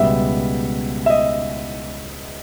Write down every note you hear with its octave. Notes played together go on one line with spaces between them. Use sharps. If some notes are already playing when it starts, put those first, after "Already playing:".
Already playing: C#2 B2 G3 B3 E5
E5
D#5